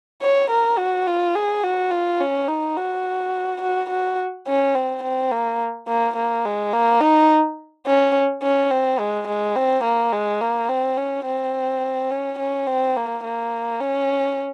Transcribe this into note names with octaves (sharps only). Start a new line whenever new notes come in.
C#5
A#4
F#4
F4
G#4
F#4
F4
C#4
D#4
F#4
F#4
F#4
C#4
C4
C4
A#3
A#3
A#3
G#3
A#3
D#4
C#4
C#4
C4
G#3
G#3
C4
A#3
G#3
A#3
C4
C#4
C4
C#4
C#4
C4
A#3
A#3
C#4